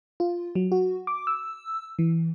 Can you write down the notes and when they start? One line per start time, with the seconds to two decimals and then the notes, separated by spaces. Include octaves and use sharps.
0.20 F4
0.55 F#3
0.72 F#4
1.07 D6
1.27 E6
1.99 E3